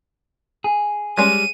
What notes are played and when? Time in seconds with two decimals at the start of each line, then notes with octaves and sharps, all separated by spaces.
0.64 G#4
1.18 G3 G#3 C#4 D#7